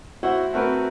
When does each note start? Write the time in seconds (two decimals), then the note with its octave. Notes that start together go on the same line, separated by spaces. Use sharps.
0.23 E4 F#4 C5 F#5
0.53 A3 C4 F#4 A#4 B4